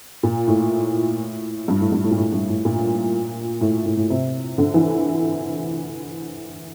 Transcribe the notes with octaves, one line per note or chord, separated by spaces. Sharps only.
A#2
A2
G2
A2
G2
A2
A#2
A2
G2
A2
A#2
A2
A2
A2
C3
D3
E3